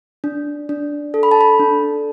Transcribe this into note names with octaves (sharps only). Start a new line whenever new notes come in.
D4
D4
A4
B5
A5
B5
D4